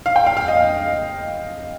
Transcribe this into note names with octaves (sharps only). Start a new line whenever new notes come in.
F5
G5
F5
F5
D#5